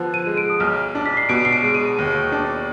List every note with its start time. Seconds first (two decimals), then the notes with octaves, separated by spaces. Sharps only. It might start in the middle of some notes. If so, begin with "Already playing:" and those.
Already playing: D3 F3 B3
0.14 D#7
0.26 G#3
0.37 D7
0.50 D#6
0.60 B1 F6
0.95 D4
1.06 B6
1.17 C7
1.29 B2 D7
1.45 C7
1.53 D7
1.63 G#3
1.75 D#7
1.99 D#2
2.32 D4